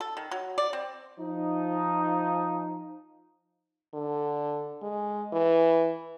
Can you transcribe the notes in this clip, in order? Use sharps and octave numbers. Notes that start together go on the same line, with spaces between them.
A4
D#3
F#3
D5
C4
F3 D#4
D3
G#3
E3